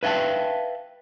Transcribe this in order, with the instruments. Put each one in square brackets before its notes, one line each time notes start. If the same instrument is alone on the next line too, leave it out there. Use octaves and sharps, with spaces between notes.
[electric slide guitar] B4 E5 F5 G5 A5